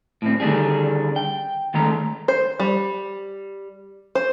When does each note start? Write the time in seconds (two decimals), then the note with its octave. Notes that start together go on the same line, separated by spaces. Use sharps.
0.22 A2 C4
0.40 D3 D#3 G3 D4 G#4
1.16 G5
1.74 D#3 G#3 A3 A#5
2.28 C5
2.60 G3
4.15 C5